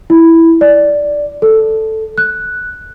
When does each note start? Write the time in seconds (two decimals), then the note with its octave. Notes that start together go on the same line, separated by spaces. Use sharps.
0.10 E4
0.61 D5
1.42 A4
2.18 F#6